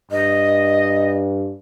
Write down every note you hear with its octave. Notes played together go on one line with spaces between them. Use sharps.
G2 D#5